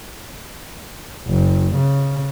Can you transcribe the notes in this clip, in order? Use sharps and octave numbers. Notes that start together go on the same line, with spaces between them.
F#1
C#3